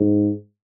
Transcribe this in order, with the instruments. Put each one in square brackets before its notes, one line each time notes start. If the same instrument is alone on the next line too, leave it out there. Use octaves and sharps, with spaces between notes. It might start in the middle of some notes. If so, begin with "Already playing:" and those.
Already playing: [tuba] G#2